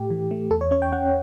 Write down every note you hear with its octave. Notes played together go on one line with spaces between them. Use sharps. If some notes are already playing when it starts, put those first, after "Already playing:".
Already playing: A2 A3 G4
E3
A3
E2 A4
C#5
C#4 C#5
G5
C#4 F#5